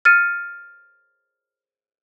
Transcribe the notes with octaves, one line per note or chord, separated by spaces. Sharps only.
F6 A6 C#7 D#7